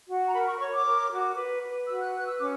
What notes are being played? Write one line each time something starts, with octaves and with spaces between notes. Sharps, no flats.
F#4
A#5
A#4 B5
C#6
C#5 C#6
D6
A#4
F#4
B4
B4
F#4 E6
F#6
B4 F#6
E6
C#4 D6